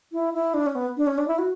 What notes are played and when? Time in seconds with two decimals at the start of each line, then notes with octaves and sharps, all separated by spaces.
0.12 E4
0.34 E4
0.54 D4
0.66 C#4
0.75 B3
0.97 D4
1.07 C#4
1.18 D4
1.28 E4
1.38 F#4